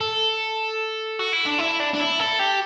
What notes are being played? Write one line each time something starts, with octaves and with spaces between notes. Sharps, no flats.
A4
F#4
E4
D4
E4
D4
D4
E4
A4
G4